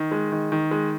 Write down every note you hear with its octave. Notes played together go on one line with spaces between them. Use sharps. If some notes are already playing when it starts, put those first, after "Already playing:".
Already playing: D#3
G#3
D#3
D#3
G#3